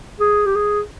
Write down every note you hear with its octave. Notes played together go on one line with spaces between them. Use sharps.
G#4
G4
G#4